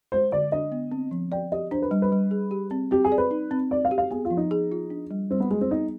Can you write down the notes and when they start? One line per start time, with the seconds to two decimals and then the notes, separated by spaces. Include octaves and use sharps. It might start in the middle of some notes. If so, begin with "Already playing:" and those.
0.12 G#3 C5
0.32 D3 D5
0.52 D4 D#5
0.72 B3
0.92 C4
1.11 F3
1.32 D5 G5
1.52 G4 D#5
1.71 D4 C5
1.82 B4
1.91 G3
2.02 B4
2.12 G3
2.31 G#4
2.51 G4
2.71 C4
2.91 C4 G4
3.04 G#4
3.12 D5
3.18 B4
3.31 D#4
3.51 C4
3.71 C4 D5
3.85 F5
3.91 G4
3.98 F5
4.11 B3 G#4
4.25 F4
4.30 F3
4.37 D#4
4.51 G#4
4.72 F4
4.90 D4
5.11 G3
5.31 G3 C4
5.40 B3
5.51 G#3 G#4
5.61 C4
5.71 B3 D#4